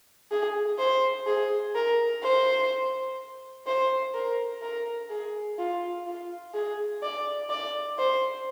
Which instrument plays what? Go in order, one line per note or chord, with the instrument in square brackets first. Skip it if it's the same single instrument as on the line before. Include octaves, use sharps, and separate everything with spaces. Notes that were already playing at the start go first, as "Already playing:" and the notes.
[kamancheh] G#4
C5
G#4
A#4
C5
C5
A#4
A#4
G#4
F4
F4
G#4
D5
D5
C5